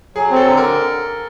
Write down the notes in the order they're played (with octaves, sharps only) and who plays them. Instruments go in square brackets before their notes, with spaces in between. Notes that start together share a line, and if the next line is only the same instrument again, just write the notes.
[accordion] F#3 [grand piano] G#4
[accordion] C4
[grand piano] A4
[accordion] D3
[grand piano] A#4